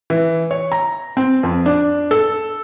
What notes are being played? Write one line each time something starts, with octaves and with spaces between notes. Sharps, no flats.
E3
C#5
A#5
C4
F2
D4
A4